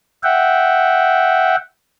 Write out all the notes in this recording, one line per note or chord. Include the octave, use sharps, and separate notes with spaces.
E5 F#5 G5